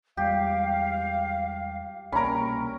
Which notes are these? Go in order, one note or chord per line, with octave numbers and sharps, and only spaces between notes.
E2 G3 G#3 G4 F5
C2 B2 A#3 C#4 A#4 A#5 B5